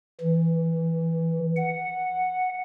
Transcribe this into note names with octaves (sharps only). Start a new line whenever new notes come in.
E3
F#5